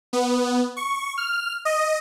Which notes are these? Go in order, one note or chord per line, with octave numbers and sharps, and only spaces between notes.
B3
C#6
F6
D#5